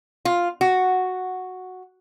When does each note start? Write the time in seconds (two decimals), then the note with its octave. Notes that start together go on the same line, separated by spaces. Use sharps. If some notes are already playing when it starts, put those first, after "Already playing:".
0.25 F4
0.61 F#4